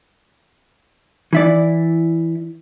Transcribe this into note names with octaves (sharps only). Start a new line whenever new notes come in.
E3 E4 D5